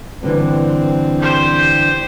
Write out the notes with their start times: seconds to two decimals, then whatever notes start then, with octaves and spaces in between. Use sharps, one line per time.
0.23 G2 D3 E3 C4
1.19 G4 C5